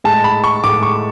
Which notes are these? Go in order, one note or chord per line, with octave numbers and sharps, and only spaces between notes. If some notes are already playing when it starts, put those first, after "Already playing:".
A2 G#3 A5
B5
C#6
A2 G#3 D6
C#6